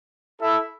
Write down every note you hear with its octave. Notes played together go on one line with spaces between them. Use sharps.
E4 A4 E5